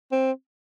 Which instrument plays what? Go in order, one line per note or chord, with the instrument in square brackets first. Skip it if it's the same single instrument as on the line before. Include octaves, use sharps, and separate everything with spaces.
[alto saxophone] C4